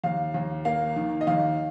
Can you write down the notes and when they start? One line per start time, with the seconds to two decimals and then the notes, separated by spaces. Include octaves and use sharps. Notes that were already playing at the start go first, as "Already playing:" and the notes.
0.04 D#2 F5
0.34 D#2
0.65 A#3 F5
0.96 D#3
1.21 D#5
1.27 D#2 F5